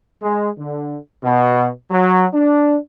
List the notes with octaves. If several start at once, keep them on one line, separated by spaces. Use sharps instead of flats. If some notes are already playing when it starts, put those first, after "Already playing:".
G#3
D3
B2
F#3
D4